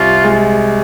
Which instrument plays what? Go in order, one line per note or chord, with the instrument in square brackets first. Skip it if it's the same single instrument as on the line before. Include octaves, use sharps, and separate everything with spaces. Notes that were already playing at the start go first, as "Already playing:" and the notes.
Already playing: [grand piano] C2 [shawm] F4
[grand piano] G#3